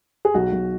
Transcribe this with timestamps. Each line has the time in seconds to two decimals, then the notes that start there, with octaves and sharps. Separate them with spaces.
0.25 G#4
0.34 B1 F#4
0.52 B1